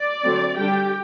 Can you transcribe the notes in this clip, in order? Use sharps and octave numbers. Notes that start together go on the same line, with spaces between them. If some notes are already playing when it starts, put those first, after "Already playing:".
Already playing: D5
D3 F#3 A3 C4
D3 G3 D4 G4 G5